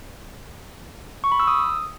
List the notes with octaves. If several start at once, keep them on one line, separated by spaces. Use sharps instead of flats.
C#6
B5
E6
D#6